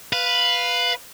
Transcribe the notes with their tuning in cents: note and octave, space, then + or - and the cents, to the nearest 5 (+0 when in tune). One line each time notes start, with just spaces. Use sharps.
B4 +0 F5 +5